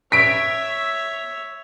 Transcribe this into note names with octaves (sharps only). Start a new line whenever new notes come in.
C#5 E5 B6 D7